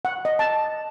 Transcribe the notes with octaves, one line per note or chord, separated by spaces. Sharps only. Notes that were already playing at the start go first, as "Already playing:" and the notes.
F#5
D#5
A5